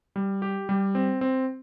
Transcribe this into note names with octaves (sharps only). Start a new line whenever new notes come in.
G3
G4
G3
C4
C4